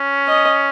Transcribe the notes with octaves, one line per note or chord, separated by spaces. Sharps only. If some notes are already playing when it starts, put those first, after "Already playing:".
Already playing: C#4
D#5